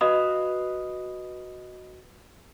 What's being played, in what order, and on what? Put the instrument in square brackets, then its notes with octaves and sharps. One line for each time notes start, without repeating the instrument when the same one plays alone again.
[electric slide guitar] F#4 B4 F5 [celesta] D#5 B5 D#6